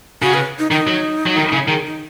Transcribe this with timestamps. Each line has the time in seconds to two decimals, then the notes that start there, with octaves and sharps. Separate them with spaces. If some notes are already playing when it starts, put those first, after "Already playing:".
0.22 C#3 F#4
0.34 B4
0.59 D#4
0.71 D#3 D#4
0.87 F#3
1.26 F#3
1.36 D#3
1.52 C#3
1.68 D#3 G#4
1.85 D#4